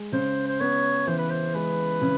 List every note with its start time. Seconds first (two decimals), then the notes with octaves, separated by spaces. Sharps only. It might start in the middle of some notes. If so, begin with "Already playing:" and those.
Already playing: G#3
0.12 C#3 C5
0.48 C5
0.60 B3 C#5
1.07 E3 C5
1.18 B4
1.30 C5
1.54 G#3 B4
2.02 C#3